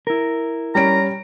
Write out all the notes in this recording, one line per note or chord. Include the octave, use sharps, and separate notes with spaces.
E4 A#4
G3 C#4 A#5 D7